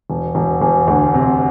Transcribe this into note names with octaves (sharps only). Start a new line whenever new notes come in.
E1
E1
E1
D2
C3